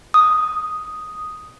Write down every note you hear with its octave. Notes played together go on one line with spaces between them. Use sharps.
D#6